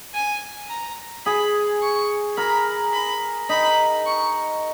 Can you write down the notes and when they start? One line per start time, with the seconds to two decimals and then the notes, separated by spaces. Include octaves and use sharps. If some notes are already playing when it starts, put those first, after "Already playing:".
0.14 G#5
0.69 A#5
1.26 G#4 B5
1.82 C#6
2.37 A#4 B5
2.93 B5
3.49 D#4 B5
4.06 C#6